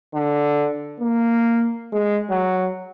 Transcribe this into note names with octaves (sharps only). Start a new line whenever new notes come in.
D3
A#3
G#3
F#3